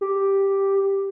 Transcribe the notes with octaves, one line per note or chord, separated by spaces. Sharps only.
G4